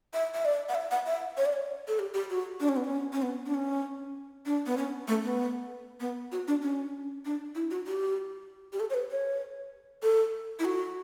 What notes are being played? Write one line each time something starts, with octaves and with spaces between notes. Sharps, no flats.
E5
E5
D5
F#5
E5
F#5
E5
C#5
D5
C#5
A4
G4
G4
F#4
D4
C#4
B3
C#4
C#4
B3
D4
C#4
D4
B3
C#4
A3
B3
B3
F#4
D4
C#4
D4
E4
F#4
G4
G4
A4
C#5
B4
C#5
A4
E4
F#4